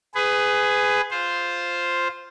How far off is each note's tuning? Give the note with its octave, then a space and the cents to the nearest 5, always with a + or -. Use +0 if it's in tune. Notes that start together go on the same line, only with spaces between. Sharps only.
G#4 +0 B4 +25
F4 +0 C5 +0